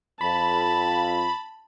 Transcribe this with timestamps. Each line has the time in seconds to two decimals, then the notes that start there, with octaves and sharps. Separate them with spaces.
0.21 F2 A5 B5